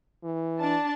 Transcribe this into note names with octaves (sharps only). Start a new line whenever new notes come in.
E3
D4 A5